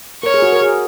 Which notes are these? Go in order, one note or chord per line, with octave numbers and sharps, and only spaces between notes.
A#4 C#5
G#4
F#4
A#4
G#4